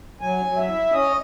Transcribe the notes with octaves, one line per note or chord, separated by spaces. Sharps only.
F#3 G#5
F#3
E5
E4
C#4 D#5